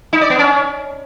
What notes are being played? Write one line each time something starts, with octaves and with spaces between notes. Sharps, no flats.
D#4
D5
B3
C#4